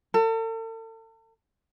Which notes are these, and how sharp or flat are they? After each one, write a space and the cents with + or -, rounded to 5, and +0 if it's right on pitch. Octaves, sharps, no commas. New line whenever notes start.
A4 +40